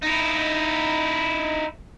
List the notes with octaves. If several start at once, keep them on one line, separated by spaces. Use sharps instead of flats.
D#4 E4